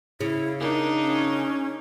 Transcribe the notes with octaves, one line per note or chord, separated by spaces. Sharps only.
C#3 E4
D4 D#4 A#4
C#4